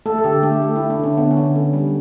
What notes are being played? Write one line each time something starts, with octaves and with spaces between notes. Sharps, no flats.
A3 A4
A4
D3 G4
A3 G4
A3
A3 E4
D4
D3 C#4
D3 B3
C#4
D3
D3
G3